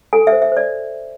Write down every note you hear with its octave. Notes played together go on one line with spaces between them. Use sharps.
A4 G#5
E5
C5
E5
C5 D5